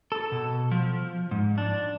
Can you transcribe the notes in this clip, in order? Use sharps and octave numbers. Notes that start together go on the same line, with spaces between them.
A4
B2
F3
G#2
D4